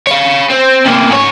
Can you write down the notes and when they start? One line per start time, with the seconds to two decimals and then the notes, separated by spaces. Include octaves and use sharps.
0.07 C#5 F5
0.50 C4
0.86 C3 A#3
1.10 G#2 C#5